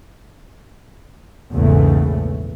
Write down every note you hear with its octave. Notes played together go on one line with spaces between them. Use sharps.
A#1 E2 G#2 C#3 A3